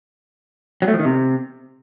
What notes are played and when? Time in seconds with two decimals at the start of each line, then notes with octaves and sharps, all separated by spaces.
0.82 F#3
0.88 A3
0.94 F3
0.99 D#3
1.05 C3